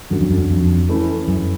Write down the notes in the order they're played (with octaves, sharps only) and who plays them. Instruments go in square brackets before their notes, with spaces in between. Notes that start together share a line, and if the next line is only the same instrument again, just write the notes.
[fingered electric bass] G2 [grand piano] D3 F#3 A3 C#4 F#4
[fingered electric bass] F2
F#2
F2
[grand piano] E3 A3 C#4 E4
[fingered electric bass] F#2